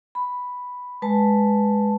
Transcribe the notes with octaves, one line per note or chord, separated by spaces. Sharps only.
B5
G#3 B4 A5